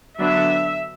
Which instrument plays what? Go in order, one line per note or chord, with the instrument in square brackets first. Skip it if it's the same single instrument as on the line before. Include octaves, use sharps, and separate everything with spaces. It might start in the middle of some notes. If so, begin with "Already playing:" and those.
[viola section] D3 F#3 B3 D4 E5